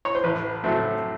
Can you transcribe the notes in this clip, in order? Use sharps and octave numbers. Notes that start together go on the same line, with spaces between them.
C#5
C5
A1 B4
A2 F#3 A3 C4